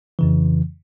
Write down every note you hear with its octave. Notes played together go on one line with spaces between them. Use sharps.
F2 C#3 E3